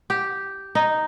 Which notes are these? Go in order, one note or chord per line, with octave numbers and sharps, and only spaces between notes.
G4
D#4